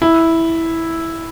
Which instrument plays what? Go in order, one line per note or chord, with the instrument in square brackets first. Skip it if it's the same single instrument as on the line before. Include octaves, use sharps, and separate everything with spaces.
[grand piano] E4